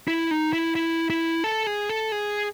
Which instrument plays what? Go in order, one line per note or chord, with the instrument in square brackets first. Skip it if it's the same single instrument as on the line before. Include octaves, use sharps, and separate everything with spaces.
[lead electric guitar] E4
D#4
E4
E4
E4
A4
G#4
A4
G#4